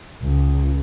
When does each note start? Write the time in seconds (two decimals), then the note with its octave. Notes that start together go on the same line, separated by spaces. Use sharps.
0.23 C#2